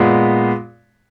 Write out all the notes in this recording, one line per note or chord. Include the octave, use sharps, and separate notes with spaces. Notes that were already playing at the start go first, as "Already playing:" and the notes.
Already playing: A#2 G#3 B3